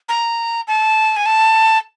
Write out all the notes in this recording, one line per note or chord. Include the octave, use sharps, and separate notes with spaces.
A#5
A5
G#5
A5